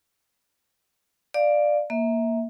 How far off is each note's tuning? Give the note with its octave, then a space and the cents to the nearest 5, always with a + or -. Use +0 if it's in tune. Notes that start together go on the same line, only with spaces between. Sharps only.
D5 +10 F5 +0
A#3 +0 E5 -20